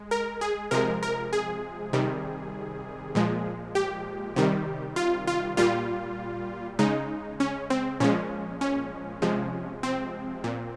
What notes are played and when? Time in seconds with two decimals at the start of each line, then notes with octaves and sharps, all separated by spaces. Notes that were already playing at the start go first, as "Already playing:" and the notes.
Already playing: G#3
0.11 A#4
0.41 G#4
0.71 C3 F3 G#3 A#4
1.03 A#4
1.33 G#4
1.93 C3 D#3 G3
3.15 A#2 F3 G#3
3.75 G4
4.36 C3 D#3 G3
4.96 F4
5.27 F4
5.57 A#2 G3 F4
6.79 C#3 G#3 D#4
7.40 C#4
7.70 C4
8.00 A#2 F3 G#3 C#4
8.61 C#4
9.22 C3 F3 G#3
9.83 C4
10.44 A#2